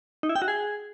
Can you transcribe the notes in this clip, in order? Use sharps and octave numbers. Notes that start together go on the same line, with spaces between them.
D#4
E4
G5
F#4
G#4